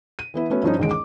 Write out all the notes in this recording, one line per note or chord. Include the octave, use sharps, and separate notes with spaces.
D#7
E3 B3 E4
A3 B3 C#4 F#4
G2 F3 C#4 D#4
A1 D#2 G#3 D7
D6